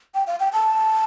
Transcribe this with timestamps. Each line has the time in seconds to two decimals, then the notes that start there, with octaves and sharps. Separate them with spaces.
0.15 G5
0.27 F5
0.40 G5
0.53 A5